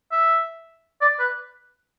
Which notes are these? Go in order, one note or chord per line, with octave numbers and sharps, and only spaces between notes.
E5
D5
B4